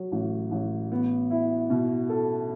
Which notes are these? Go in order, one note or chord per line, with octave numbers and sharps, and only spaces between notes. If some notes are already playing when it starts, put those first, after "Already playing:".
Already playing: F#3
A1
A1
B3
E4
B2
A4